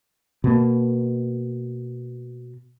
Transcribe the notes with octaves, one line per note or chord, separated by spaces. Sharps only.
B2 A#3